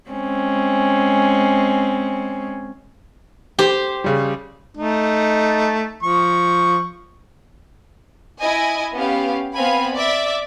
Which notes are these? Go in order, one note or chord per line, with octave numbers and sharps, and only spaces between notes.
G#3 C4 C#4
G4 C5
C#3 G3
A3 D#4
F3 C#6
E4 D#5 G#5
B3 C#4 G4 F5
B3 C4 F5 G#5 B5
D5 E5 D6